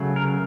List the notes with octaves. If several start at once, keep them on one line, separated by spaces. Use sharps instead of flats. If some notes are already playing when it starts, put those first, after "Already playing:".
Already playing: C#3 F#3 A3
A#4